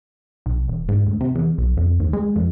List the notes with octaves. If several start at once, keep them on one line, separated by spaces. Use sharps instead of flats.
B1
E1
G#2
D2
C3
E2
B1
F2
D#2
G#3
F2